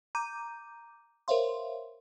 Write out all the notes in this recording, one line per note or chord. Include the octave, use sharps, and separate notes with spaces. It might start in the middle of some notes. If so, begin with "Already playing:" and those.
A#5 D6 G6 D#7
A#4 C5 C#5 E5 F5 C6